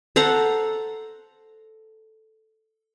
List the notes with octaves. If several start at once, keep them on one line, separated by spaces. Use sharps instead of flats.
A4 C5 F#5 A#5